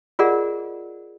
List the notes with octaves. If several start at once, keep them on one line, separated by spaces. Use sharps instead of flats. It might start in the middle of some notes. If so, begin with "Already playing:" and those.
F4 G#4 A#4 D5 D#5 F#5